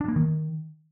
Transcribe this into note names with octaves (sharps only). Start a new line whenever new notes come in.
D4
A#3
D#3